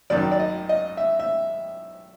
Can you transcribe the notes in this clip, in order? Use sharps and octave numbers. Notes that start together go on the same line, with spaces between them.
G#1 F#2 D#3 D5
D5
D#5
D#5
E5
E5